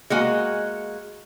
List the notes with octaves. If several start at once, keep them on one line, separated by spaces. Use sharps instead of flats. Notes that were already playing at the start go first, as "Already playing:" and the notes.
G#3 A#3 F#4 G#5